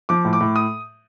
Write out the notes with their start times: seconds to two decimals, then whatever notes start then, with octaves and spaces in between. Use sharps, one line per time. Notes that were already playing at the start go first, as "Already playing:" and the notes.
0.09 F3 D6
0.25 A2
0.33 D6
0.41 A2
0.56 D#6